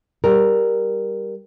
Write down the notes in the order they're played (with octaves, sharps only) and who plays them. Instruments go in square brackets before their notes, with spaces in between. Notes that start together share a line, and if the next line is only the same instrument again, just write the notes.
[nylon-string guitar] G3 A#4